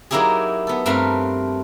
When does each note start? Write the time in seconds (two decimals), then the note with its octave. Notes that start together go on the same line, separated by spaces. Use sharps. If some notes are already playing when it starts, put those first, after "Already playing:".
0.11 F#3 A#3 D#4 E4 G4 G#4
0.67 B3 A4
0.86 G2 A3 C4 A#4 F5 B5